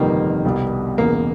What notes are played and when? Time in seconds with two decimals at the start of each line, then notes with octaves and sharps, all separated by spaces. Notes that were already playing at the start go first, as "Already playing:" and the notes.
Already playing: G1 F2 C3 D#3 G3 A#3
0.45 C2 B2 G3
0.98 E1 E2 C#3 A#3